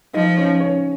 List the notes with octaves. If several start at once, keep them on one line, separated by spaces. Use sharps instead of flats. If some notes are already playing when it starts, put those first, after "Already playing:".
F3 D#4 D#5
C#4 C#5
C#4 C#5